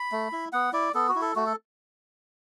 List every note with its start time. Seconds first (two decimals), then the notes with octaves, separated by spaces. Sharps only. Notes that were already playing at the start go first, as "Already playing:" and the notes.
Already playing: B5
0.12 A3
0.32 E4
0.53 B3 F#5
0.73 E4 D5
0.94 B3 A4
1.08 F#4
1.15 E4
1.21 A4
1.35 A3 F#4
1.46 A4